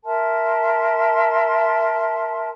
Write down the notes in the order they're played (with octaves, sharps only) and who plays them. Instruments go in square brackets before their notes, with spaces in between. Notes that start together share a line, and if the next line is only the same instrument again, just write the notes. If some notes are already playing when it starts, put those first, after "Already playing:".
[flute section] A#4 E5 A5 C6